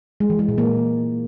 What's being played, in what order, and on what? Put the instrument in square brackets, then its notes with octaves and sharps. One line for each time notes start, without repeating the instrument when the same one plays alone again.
[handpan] G#3
E3
G#3
A#2
A#3